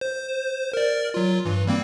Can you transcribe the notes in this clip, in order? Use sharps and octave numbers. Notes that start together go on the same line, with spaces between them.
C5
A#4 D5
F#3 F4
G2 E3
G3 A#3 C4